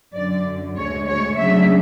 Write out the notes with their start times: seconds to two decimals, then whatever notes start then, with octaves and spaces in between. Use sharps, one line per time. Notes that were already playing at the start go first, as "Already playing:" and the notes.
0.14 F#2 D3 F#3 D5
0.76 D2 D3 G#3 C#5
1.08 C#5
1.38 C#3 F#3 A3 D4 E5